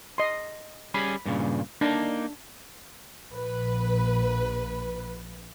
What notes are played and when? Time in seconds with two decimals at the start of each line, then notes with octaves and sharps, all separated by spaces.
0.18 D#5 C6
0.94 G3 C#4 G#4 B5
1.26 G2 A#2 C#3
1.81 A#3 D4 D#4
3.32 A#1 B4